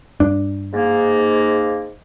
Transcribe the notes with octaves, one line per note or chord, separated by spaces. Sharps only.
G2 D4
G#2 A#3